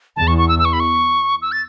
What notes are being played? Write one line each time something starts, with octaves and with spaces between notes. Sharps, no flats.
E2 A5
C#6
C#6
E6
E6
C#6
B5
C#6
E6
A6